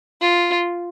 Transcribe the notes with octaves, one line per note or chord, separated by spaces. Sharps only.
F4